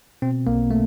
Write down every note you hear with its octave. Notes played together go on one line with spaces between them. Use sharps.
B2 C4
B1 A#3
A3